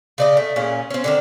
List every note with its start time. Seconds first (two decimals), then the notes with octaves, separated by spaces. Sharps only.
0.18 C#3 D5 D#5
0.37 A3
0.56 A#2 C#4 G#4
0.90 C4 C#4
1.04 D3 D#3 D4